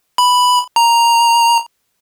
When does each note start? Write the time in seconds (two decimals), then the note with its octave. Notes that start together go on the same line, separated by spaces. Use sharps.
0.18 B5
0.76 A#5